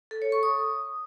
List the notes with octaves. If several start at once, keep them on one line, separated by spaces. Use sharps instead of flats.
A4
C#5
C#6
D#6